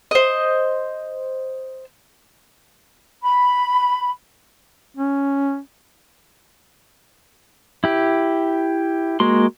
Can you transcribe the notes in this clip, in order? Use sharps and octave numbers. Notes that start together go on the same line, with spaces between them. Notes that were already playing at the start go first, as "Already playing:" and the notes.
C5 D#5
B5
C#4
E4 G4
G#3 A#3 F#4 C6